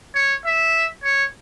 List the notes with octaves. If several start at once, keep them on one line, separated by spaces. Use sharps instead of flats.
C#5
E5
C#5